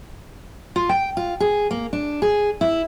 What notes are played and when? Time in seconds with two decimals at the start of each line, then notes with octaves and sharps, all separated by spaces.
0.76 F4
0.89 G5
1.17 F4
1.40 G#4
1.71 A#3
1.93 D4
2.22 G#4
2.61 E4